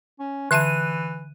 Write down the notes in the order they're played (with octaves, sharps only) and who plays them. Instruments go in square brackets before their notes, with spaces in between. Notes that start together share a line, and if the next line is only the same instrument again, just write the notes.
[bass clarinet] C#4
[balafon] D3 E5 A5 [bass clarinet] E3 [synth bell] F#6 D#7